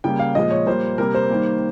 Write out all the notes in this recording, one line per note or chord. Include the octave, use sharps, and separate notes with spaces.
C#3 G3 A#3 G5
F5
A#2 F3 G#3 D#5
C#5
A#2 G3 A#3 C5
C3 G3 A#3 A#4
C5
D#3 G3 A#3